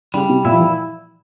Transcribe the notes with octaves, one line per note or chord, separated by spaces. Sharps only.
C#3 G3
C3
A#2 E4
F3
E3